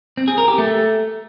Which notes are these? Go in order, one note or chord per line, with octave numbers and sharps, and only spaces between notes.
C4
G#4
A#4
G4
A3